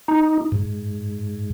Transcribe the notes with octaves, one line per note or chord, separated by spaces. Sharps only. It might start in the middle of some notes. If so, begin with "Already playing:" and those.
D#4
G#2